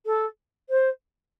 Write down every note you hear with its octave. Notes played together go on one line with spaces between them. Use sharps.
A4
C5